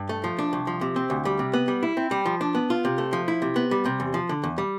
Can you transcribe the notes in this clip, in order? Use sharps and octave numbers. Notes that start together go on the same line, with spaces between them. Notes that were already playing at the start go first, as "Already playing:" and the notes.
Already playing: G2
A3
F3
D4
C2
F3
C3
C4
D2
G3
C3
B3
G3
E4
C4
G3
F3
D4
B3
F4
C3
A3
F3
E4
C3
B3
G3
C3
E2
F3
D3
E2
G3